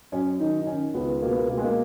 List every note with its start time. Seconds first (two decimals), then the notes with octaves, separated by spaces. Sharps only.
0.12 F#2 C#4
0.40 D#3 D#4
0.61 D#4
0.67 D#3 C#4
0.94 C#2 B3
1.22 B2 A#3
1.29 B3
1.37 A#3
1.50 B2 A#3
1.58 G#3
1.64 A#3